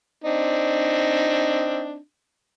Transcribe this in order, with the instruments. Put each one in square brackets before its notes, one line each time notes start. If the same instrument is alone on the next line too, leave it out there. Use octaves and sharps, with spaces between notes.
[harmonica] C4 D4 D#4